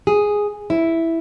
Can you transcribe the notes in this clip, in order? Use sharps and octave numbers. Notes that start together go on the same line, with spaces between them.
G#4
E4